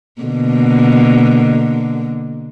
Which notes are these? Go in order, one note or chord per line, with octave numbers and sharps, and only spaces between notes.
B2 D3 A#3